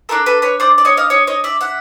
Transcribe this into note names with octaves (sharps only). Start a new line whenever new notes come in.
D4 F#4 A4 A#4
A4 B4
B4 C#5
C5 D5
D5
C#5 D#5
D#5 F5
C#5 D#5
C#5 D#5
D5 E5
E5 F#5